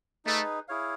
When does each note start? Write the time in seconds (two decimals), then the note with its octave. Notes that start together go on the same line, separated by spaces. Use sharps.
0.25 A3 D#4 G#4 B4
0.68 E4 G#4 C#5 F5